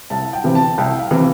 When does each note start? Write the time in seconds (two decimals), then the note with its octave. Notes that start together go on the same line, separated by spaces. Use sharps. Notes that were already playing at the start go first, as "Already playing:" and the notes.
0.10 C2 A5
0.33 G5
0.44 C3 E3
0.55 A5
0.78 C2 G5
0.99 F5
1.11 C3 E3